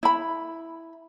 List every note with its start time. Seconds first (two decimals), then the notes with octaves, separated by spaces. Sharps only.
0.03 E4 B5